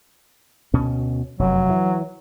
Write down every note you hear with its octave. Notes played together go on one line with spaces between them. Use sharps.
D2 B2 C#4
F1 F#2 F#3
E3